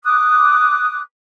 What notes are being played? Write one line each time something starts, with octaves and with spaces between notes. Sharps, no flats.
D6 D#6 F#6